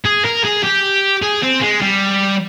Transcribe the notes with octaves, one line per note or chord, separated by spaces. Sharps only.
G#4
A#4
G#4
G4
G#4
C4
G#3
G3